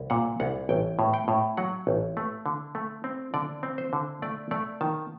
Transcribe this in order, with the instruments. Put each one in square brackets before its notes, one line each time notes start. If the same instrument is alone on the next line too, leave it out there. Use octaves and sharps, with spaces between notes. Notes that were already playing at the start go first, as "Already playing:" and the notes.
Already playing: [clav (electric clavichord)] C2
A#2 F#5
C2 F#5
A1 G5
A2
G5
A2
F#3 F#5
A1
A3
D3
A3
C4
D3 D5
C4
C5
D3
A3 D5
A3 D5
D#3 A5